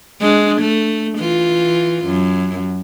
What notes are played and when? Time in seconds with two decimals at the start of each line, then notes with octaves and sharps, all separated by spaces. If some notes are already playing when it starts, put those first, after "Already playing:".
0.20 G#3 D4
0.61 A3
1.18 E3 F4
2.05 F#2